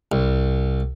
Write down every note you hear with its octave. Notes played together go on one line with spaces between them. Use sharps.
C2